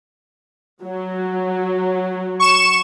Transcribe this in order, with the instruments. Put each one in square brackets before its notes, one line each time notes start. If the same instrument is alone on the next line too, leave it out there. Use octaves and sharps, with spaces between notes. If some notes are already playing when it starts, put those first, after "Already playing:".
[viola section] F#3
[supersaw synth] C#6 E7